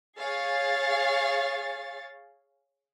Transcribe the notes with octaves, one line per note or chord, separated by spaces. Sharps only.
G#4 C#5 F5 A6